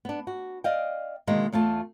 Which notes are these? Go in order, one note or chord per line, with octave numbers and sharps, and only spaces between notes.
B3 D4
F#4
D5 D#5 F5 G5
B2 D3 D#3 G#3 A#3
E2 A3 F4 A5